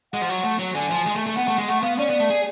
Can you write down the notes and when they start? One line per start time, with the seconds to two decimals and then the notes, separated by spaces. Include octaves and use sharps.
0.13 G#3 F#5
0.21 F3
0.29 F#3
0.44 A3
0.59 F#3
0.75 D3 G#5
0.91 F3
1.06 G#3
1.16 A3
1.27 A3
1.37 B3 F#5
1.48 A3
1.58 G#3
1.68 A3 F#5
1.83 B3 F5
1.98 C#4 D5
2.10 B3
2.20 A3
2.30 G#4